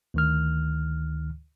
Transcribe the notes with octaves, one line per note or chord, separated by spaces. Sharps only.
D2 D#3 F6